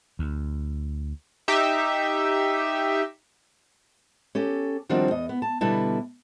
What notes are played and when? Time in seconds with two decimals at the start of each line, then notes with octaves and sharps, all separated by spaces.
0.19 D2
1.48 D#4 G4 E5
4.35 C#4 G4 A4
4.89 D#3 F3 G3 C4 D4 F#4
5.11 E2 D#5
5.29 B3
5.42 A5
5.61 B2 D3 G3 E4 B4 A5